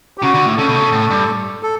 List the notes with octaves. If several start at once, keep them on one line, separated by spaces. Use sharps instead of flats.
G4
C#3 F#4
D3
A2
C#3 A4
B2
C#3
A2
G2
A4